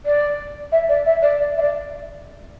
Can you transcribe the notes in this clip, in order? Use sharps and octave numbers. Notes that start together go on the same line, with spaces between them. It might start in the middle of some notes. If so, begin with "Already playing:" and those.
D5
E5
D5
E5
D5
D5
E5
D5